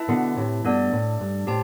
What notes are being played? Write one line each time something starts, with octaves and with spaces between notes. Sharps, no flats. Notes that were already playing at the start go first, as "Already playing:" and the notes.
Already playing: E4 B4 E5 A5
B2 D3
A2 C3
G2 B2 A3 D4 A4 D5
A2
G2
A2 G4 C5 A5